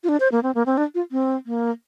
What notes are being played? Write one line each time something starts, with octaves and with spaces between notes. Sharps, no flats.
F4
D4
C5
A#3
C4
A#3
C4
D4
F4
C4
A#3